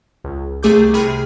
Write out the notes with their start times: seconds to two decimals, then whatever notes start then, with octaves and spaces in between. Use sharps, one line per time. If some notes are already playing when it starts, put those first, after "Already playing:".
0.24 C#2
0.63 C2 A3 G#4 D6 G6
0.93 C3 G#4 B5 F6